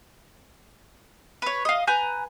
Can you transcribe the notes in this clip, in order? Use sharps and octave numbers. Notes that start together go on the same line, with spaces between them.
B4 C#5
D#5 F5
B4 G#5 A#5 G6